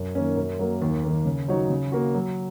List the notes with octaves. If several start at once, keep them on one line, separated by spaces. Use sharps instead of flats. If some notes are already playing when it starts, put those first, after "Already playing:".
Already playing: F#2
D#3 A#3 C#4
F#2
F#3 A#3
D#2
D#3 A#3
C#3
F#3 D#4 F#4 C#5
C#3
A#3 F#4
F#3